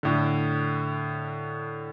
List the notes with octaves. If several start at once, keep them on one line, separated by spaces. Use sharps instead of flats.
A2 D3